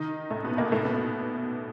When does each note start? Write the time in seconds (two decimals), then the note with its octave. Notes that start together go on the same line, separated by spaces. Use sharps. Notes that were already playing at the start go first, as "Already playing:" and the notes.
Already playing: D#3 D#4
0.30 A2 A3
0.44 B2 B3
0.58 A#2 A#3
0.72 A2 A3
0.85 B2 B3